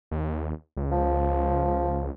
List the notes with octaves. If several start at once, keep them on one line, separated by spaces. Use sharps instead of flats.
D#2
C#2
F3